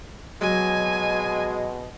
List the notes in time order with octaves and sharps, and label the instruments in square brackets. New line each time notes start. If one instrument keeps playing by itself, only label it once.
[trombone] B2 [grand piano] F#3 [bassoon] G#3 [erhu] G#5